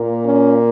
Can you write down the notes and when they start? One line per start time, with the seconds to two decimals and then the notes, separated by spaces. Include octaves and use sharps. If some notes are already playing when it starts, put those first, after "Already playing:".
Already playing: A#2 A#3
0.24 C#4